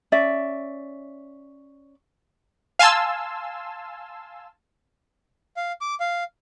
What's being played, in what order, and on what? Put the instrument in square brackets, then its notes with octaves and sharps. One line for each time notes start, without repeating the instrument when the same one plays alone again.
[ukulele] C#4 D5 E5
[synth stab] F5 G#5 A5 C6 E6
[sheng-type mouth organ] F5
D6
F5